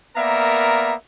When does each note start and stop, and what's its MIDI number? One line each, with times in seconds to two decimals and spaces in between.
0.17 0.95 58
0.17 0.95 59
0.17 0.95 70
0.17 0.95 74
0.17 0.95 76
0.17 0.95 82